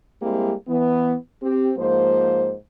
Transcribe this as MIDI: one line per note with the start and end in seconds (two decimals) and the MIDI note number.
0.22 0.53 55
0.22 0.53 56
0.22 0.53 58
0.22 0.53 60
0.22 0.53 64
0.22 0.53 67
0.68 1.15 52
0.68 1.15 59
1.43 1.71 60
1.43 1.71 67
1.78 2.54 44
1.78 2.54 53
1.78 2.54 58
1.78 2.54 72